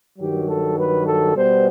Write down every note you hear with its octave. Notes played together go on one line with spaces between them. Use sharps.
G2 D#3 F#3 G4
A4
B4
A4
B2 G3 B3 C5